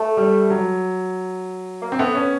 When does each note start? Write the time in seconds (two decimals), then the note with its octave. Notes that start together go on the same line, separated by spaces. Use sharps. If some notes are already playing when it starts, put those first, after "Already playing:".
Already playing: A3
0.17 G3
0.50 F#3
1.82 A#3
1.92 C4
1.99 A3 B3
2.15 C#4